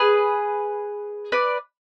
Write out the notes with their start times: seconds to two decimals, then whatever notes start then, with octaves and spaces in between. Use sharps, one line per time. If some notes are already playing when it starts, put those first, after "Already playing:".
Already playing: G#4 B4
1.32 B4 D5